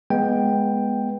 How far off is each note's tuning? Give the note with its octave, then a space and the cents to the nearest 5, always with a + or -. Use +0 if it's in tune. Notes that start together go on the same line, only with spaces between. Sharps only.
G#3 +0 B3 -10 G5 +5